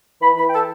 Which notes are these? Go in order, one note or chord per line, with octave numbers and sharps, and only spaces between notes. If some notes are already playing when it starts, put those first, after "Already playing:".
E3 B4 B5
E3 B4 B5
G5
A4 A5